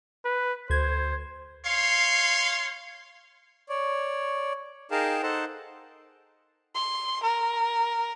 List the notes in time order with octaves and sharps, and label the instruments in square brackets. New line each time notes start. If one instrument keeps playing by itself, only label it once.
[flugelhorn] B4
[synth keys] D2 G#6 [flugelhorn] C5
[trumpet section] C#5 F5 C6
[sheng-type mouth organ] C#5 D5
D#4 G#4 A#4 F5 G5 A5
D#4 A4 C5 F#5 A5
[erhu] C6
A#4